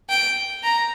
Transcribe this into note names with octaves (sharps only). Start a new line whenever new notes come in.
G5
A#5